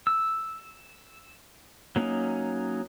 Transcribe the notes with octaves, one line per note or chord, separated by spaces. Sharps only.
E6
F#3 A#3 C#4 D#4